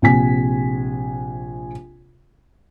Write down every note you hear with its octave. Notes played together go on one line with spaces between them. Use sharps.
A#1 C3 G#5 B6